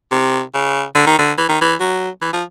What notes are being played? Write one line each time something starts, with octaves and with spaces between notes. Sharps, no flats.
C3
C#3
D3
D#3
D3
E3
D#3
E3
F#3
E3
F3